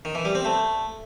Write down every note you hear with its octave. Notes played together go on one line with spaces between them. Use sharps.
D#3
E3
G3
C4
A3